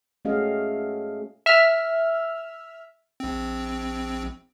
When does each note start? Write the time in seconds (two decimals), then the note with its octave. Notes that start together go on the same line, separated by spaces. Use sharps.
0.25 A3 C#4 F#4 G#4 D#5 F5
1.46 E5 F6
3.20 A#1 C4